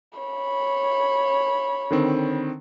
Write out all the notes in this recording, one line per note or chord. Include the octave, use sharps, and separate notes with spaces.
C#5 B5
D3 D#3 C4